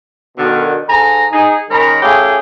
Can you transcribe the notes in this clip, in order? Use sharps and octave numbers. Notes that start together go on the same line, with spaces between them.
B2 D3 D#3
G#2 A4 G#5 A#5
D#4 G#4
D#3 G#3 C#4 A#4 A#5 B5
A3 C#4 F4 G4 G#4